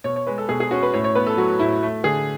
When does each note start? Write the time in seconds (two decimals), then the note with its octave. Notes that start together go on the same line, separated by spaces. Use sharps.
0.04 B2 C#5
0.16 C#5
0.27 G#3 B4
0.38 A4
0.49 B2 G#4
0.60 G#4
0.71 C#4 F#4
0.83 B4
0.93 A2 C#5
1.04 C#5
1.15 B3 B4
1.27 A4
1.37 F#3 F#4
1.59 A2 E4
1.83 A3
2.04 D3 G#4